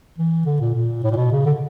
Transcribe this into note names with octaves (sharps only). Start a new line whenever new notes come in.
E3
D3
A#2
A#2
A2
A#2
B2
C#3
D3